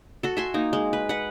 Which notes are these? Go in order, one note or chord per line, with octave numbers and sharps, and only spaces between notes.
F#4 A4
E5 G#5 C6
A#3 D#4
G#3
B4
B4 F#5